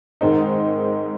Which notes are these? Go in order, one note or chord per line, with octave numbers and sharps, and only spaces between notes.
G#2 D#3 G#3 C4 D#4